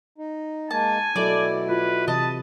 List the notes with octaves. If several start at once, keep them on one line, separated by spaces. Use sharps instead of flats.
D#4
G#3 A#3 G#5 A5
B2 F#3 E4 A4 D5
F4 B4
C3 E3 D#5 A5